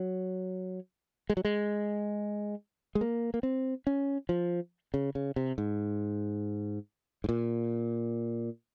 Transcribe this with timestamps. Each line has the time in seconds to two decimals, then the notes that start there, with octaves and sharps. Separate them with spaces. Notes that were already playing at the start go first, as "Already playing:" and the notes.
Already playing: F#3
1.30 G#3
1.37 F#3
1.45 G#3
2.95 G#3
3.01 A#3
3.34 A#3
3.43 C4
3.87 C#4
4.29 F3
4.94 C#3
5.15 C#3
5.36 C3
5.58 G#2
7.24 G#2
7.29 A#2